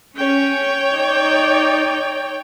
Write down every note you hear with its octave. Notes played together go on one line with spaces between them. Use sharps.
C#4 C#5 G5
D#4 D5